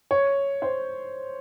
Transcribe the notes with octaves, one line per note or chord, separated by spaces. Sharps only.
C#5
C5